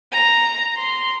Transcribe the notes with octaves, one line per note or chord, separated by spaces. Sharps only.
A#5
C6